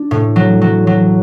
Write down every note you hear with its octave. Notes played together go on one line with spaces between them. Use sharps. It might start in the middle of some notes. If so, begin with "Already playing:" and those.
Already playing: D4
A2
F#3
F#3
F#3